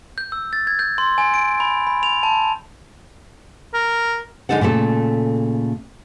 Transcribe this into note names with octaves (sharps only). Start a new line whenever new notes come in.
G6
E6
A6
G#6
G6
C6
G#5
D7
B5
B5
F7
A5
A#4
D3 G#3 D#4 A4 F#5
A#2 C#3 A3 A4